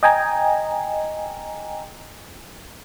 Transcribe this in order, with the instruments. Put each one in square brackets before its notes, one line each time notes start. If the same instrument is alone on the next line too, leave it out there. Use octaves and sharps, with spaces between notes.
[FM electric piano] D#5 G5 G#5 A#5